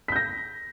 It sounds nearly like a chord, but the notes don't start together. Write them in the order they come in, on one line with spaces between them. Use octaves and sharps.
B6 G6 A#6